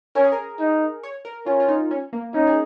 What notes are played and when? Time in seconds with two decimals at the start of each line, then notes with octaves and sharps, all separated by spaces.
0.15 C#4 A#4
0.24 G#4
0.32 A#4
0.60 D#4
1.03 C#5
1.25 A#4
1.46 C#4 F4
1.60 F4
1.68 D#4
1.91 C#4
2.13 A#3
2.34 C#4 D#4
2.47 G#4